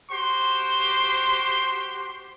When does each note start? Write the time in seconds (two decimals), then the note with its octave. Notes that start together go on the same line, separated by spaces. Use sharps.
0.11 F#4 G4 C5 C6